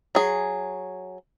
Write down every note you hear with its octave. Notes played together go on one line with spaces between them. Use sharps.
F#3 G#4